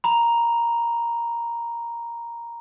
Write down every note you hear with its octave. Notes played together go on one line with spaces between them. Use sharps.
A#5 B5